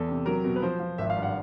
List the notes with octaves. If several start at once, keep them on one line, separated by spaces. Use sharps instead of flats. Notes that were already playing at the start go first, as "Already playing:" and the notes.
Already playing: E2 A4
C3
F#3 A#4
B2
B4
F3 C5
F3
G#1 E5
F5
G2
F#5